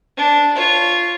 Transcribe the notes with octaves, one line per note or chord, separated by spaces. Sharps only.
D4
F4 C#5